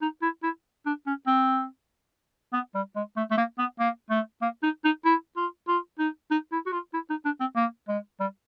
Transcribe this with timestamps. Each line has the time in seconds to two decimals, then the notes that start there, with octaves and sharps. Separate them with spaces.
0.02 D#4
0.22 E4
0.43 E4
0.86 D4
1.07 C#4
1.27 C4
2.53 B3
2.75 G3
2.96 G#3
3.16 A3
3.31 A3
3.37 A#3
3.58 B3
3.79 A#3
4.10 A3
4.42 A#3
4.63 D#4
4.84 D#4
5.05 E4
5.36 F4
5.68 F4
5.99 D#4
6.31 D#4
6.52 E4
6.66 F#4
6.72 F4
6.94 E4
7.10 D#4
7.25 D4
7.40 C4
7.56 A#3
7.88 G#3
8.20 G3